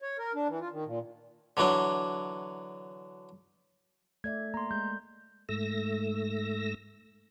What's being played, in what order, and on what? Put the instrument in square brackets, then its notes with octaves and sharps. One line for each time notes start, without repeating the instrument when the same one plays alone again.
[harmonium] C#5
A#4
D4
E3
F4
D#3
A#2
[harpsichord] D3 E3 F#3 D4
[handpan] A3 D5 E5 [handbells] G#6
[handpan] A#3 [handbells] A#5 C6
[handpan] G#3 [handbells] G6
[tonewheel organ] G#2 A3 E6 A#6